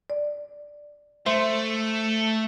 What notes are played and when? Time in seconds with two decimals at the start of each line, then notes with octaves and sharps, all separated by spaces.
0.10 D5
1.26 A3 C5 E5 C6